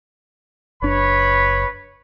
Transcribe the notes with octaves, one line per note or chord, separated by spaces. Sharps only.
F#1 D4 B4 C#5 B5